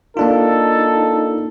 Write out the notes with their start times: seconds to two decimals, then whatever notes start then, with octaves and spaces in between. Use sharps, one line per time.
0.17 A#3 D4 D#4 F4 A4